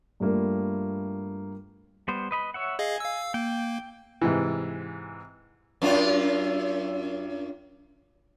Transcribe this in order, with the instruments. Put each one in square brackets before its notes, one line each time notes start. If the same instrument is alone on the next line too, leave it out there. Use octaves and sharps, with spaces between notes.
[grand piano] G2 G3 A3 A#3 D4 F4
[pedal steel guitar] G3 B3 C5
B4 D#5 B5
C#5 E5 F#5
[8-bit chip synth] G#4 D#5 F5 [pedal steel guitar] G#5
[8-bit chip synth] F5 E6
[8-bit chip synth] A#3 [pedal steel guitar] G5
[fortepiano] G#2 C3 E3
[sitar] F#2 D4 F4